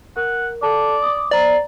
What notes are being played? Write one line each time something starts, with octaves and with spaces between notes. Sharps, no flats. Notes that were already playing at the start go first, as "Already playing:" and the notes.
A#4 F#5
A4 D5 A5
D6 D#6
C5 D5 A#5